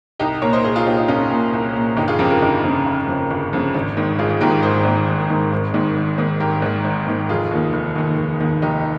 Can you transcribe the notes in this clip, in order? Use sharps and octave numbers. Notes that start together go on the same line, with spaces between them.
C2 D#4 G4
A#2 A#4 C#5
C5 D#5
C2 G#4 C5
F4 G#4
A#2 D#4 G4
D#4
C2 C#4 F4
A#2
C2
A#2
G1 D#4 G4
F4 G#4
F2 C#3 G4 A#4
G4 A#4
G1 D#4 G4
F2 C#3
G1
F2 C#3
G1
F2 C#3
G#1
G#2 D#3
G#1 F4 G#4
G#2 D#3 G4 A#4
G#1 G#4 C5
G#2 D#3
G#1
G#2 D#3
G#1
G#2 D#3
G#1
G#2 D#3
G#1 G4 A#4
G#2 D#3
G#1
G#2 D#3
F1 F4 G#4
D#2 D#3
F1
D#2 D#3
F1
D#2 D#3
F1 D#4 G4